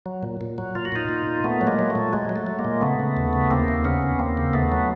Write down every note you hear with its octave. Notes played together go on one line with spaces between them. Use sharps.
F#3
A#2
A#2
F#3
A#2 F4
F#4
A#2 D#4 F4
A#2
A#2
A#2 A3 B3
F#3
G#3 A#3
F#3
A3
A#2
F#3 G#3
F#3
A3
F#3
G#3 A#3
A#2
C#3 A3 B3
C#3
D#2
C#3
D#2 A#3 C4
D#2
C#3 B3 C#4
D#2
D#2 A#3 C4
C#3
D#2 A3 B3
F#3